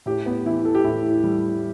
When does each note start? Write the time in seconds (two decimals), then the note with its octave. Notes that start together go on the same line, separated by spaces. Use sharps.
0.06 A2 G4
0.26 B3
0.45 E3 E4
0.65 A4
0.75 G4
0.84 A2 E4
1.24 G3